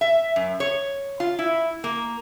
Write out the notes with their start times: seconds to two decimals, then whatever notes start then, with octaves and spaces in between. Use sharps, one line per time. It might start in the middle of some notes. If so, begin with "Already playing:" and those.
0.01 E5
0.36 F#2
0.60 C#5
1.20 F4
1.39 E4
1.84 A#3